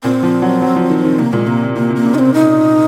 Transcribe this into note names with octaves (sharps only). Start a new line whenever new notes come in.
A#2 C4
F3
F#3
F#3
F3
D#3
D#3
C3 A#3
A#2 G#3
C3 A#3
C3
C3 A#3
C3
A#3
C#3
D#4
C3 C4
D#4